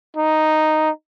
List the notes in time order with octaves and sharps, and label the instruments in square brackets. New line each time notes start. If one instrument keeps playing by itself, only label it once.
[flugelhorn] D#4